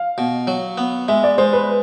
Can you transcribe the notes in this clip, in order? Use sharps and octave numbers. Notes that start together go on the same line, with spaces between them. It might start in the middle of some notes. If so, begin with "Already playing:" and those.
Already playing: F5
B2
F#3
B3
G#3 E5
D5
G#3 C5
B4